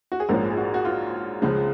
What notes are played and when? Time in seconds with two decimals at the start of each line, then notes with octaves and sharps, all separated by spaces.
0.12 F#4
0.20 G#4
0.29 A#1 G#2 F3 G#3 C#4 A#4
0.50 G#4
0.57 F#4
0.74 F#4
0.85 F4
1.42 C#2 C#3 F3 G#3